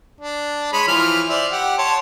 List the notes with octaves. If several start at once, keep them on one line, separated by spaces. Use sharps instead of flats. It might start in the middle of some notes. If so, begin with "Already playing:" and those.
D4
G#3 C#5 B5
E3 F3 F6
C5 D5 E5
G4 F#5
C#5 A5 C6